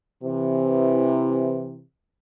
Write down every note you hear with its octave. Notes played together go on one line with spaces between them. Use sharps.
C3 E3